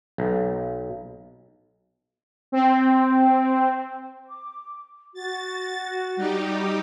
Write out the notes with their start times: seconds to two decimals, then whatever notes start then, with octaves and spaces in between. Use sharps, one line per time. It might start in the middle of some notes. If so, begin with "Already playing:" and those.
0.18 B1
2.52 C4
4.27 D6
5.14 F#4 A6
6.16 G3 D#4 G4